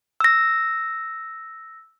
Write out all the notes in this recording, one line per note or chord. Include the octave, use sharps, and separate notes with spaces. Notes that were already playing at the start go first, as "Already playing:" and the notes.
E6 A#6